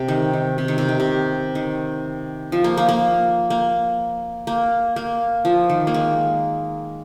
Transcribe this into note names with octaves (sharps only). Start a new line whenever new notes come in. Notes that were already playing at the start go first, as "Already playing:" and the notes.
Already playing: C3
D#3
D#3
C3
D#3
C3
D#3
C3
D#3
F3
A#3
A#3
A#3
A#3
A#3
A#3
F3
D#3
A#3
G#3